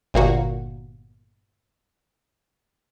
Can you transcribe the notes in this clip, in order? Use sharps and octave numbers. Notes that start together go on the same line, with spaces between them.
G1 A#2 A#3 F#4